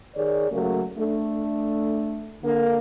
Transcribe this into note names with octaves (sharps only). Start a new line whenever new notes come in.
D#3 G#4 C#5 D5
C#3 F#3 A3 A#3
A3 D4
D3 A#3